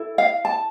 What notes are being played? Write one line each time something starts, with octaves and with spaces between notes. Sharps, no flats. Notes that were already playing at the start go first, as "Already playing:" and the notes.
Already playing: E4 A4
F5
A5